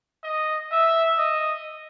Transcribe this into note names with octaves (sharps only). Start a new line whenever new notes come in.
D#5
E5
D#5